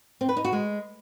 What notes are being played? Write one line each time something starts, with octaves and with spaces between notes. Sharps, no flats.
C4
B4
D#4
F#4
G#3